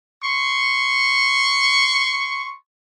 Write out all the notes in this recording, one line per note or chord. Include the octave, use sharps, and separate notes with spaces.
C6 C#6